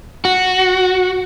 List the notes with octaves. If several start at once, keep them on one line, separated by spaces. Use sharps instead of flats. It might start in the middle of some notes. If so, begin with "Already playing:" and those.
F#4